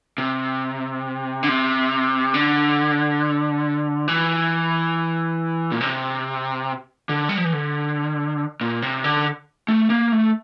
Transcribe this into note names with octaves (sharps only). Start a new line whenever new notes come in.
C3
D3
C3
D3
E3
A#2
C3
D3
G3
F3
E3
D3
A#2
C3
D3
A3
A#3
A3